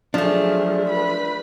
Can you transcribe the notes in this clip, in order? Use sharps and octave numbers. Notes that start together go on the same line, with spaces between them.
F3 F#3 A3 D4 G#4
B4 B5